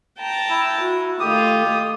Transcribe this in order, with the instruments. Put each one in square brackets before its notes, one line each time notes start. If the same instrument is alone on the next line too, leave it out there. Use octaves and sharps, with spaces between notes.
[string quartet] G5 A5 A#5
[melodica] E4
[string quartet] F#4
[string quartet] D#3 A3 F4 [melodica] G4 D#6